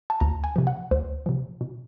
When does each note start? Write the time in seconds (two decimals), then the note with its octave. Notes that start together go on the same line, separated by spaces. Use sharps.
0.10 A5
0.20 D2 A#5
0.44 G#5
0.56 C3 F3
0.67 F#5
0.91 D2 C5
1.26 C3 F3
1.61 B2